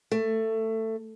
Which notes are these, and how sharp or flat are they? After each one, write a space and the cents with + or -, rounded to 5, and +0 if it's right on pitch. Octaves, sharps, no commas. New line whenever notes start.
A3 +15